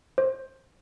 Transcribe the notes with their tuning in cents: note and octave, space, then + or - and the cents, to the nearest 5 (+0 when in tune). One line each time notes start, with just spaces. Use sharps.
C5 +20